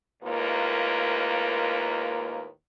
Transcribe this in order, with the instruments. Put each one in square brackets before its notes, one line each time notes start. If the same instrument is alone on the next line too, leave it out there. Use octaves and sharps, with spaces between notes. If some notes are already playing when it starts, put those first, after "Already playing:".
[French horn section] D#2 A2 G#3 A#3 F4 B4